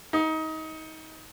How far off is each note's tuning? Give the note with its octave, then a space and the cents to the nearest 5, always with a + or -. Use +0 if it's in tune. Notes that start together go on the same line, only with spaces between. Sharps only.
D#4 +25